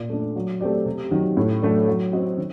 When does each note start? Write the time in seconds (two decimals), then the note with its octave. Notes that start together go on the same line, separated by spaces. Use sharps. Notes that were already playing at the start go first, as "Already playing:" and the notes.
Already playing: A#2
0.10 A3 D4
0.36 F#3
0.61 A3 C4 G4 D5
0.86 C3
1.11 D#3 F#3
1.37 A2
1.62 F#3 A3 D4
1.88 F#3
2.12 C4 F#4 C5 D#5
2.38 D#3